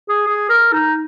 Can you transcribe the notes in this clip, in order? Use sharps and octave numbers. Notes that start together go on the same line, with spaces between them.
G#4
G#4
A#4
D#4